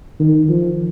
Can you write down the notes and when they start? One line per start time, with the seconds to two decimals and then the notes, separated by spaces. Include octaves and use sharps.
0.20 D#3
0.49 F3